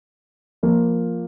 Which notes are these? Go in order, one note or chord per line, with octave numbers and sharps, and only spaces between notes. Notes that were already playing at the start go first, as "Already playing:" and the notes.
F3 A#3 F4